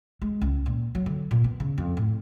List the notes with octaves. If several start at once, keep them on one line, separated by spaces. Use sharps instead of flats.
G#3
C#2
A#2
F#3
D3
A#2
B3
C#3
F2
A2